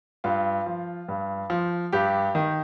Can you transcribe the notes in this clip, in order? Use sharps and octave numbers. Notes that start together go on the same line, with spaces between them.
G2 F4
F3
G2
F3
G2 G4
D#3